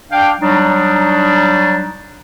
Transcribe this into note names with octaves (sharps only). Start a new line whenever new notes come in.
D4 F5 G5
F#3 G3 D4 D#4